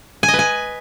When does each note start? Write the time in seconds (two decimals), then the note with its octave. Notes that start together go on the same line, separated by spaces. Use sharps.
0.23 G#5
0.28 D#5
0.34 B4
0.39 G#5